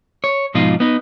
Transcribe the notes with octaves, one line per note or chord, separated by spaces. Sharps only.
C#5
G#2 B2 F3 D#4 F4
B3 D#4